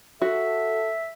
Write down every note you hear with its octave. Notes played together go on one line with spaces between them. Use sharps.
F#4 A4 E5